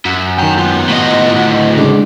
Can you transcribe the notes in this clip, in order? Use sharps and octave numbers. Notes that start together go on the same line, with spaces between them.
F#2 F#5
D#3 G5 A#5 G6
B3 F4 F#5
A2 D#5
D2 F#3
C#3 G#3 D4 D6